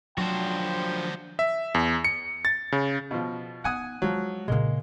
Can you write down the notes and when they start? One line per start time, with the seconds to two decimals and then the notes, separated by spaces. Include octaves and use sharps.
0.18 F3 F#3 D4 F#4 C5 G5
1.39 E5
1.75 E2
2.04 C#7
2.45 A6
2.72 C#3
3.11 B2 F3
3.64 B3 D#4 F#5 G#5 D#6
4.02 F3 F#3 G#3
4.48 A#2 C#3 G#3 A#3